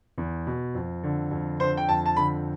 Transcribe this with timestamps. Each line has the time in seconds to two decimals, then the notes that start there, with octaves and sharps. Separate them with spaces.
0.18 E2
0.47 B2
0.75 F2
1.03 D3
1.31 F2
1.60 D3 C5
1.77 G5
1.89 F2 A5
2.06 A5
2.17 D3 B5